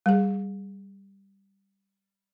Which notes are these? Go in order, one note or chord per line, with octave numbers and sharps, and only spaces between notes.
G3 G#4